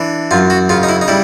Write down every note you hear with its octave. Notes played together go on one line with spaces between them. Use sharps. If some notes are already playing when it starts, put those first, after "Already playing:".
Already playing: E3 D4
F#2 F4
F#4
C#3 F4
D#4
E4
D#4
G3 E4